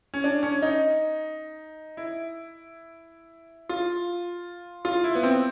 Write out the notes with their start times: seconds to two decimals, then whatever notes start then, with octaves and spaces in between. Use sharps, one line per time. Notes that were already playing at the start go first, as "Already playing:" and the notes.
0.14 C#4
0.24 D4
0.43 C#4
0.62 D#4
1.97 E4
3.69 F4
4.85 F4
5.04 E4
5.15 B3
5.23 C4